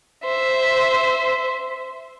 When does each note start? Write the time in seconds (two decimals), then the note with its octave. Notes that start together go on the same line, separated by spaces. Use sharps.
0.25 C5 E5